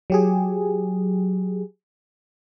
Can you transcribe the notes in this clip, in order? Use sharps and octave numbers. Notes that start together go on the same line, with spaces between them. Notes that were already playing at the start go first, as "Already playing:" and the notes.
F#3 G4 G#4